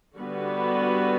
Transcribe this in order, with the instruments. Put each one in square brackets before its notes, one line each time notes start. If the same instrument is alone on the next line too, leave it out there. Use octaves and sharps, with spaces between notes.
[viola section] D3 G3 B3 F#4 B4